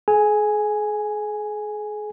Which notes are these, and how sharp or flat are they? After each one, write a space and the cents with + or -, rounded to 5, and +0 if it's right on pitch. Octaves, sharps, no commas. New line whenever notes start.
G#4 +35 G#5 +0